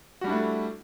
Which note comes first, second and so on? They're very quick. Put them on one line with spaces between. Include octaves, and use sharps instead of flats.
F#4 G3 D4 E4 A3